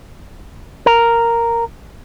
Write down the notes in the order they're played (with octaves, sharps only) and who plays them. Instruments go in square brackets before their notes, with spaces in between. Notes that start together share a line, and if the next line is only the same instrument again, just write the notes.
[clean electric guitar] A#4